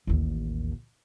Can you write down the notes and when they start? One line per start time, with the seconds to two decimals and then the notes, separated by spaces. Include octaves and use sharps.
0.07 A1 D#2